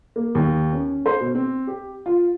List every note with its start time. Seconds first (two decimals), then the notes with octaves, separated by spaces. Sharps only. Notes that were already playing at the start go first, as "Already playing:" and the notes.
0.16 A#3
0.35 D#2
0.73 C#4
1.06 C5
1.20 B2
1.35 C4
1.67 G4
2.06 F4